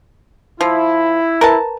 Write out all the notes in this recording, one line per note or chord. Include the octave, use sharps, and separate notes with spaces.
F3 E4
A#4 B4 A5